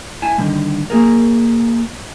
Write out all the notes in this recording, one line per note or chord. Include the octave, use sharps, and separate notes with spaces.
E4 G#5 A5
D3 D#3 G3
A#3 G#4 A#4